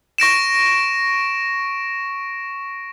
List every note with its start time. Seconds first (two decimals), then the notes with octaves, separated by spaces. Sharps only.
0.18 C#6 A#6 D7 E7